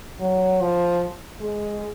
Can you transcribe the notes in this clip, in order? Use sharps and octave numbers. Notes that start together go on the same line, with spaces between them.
F#3
F3
G#3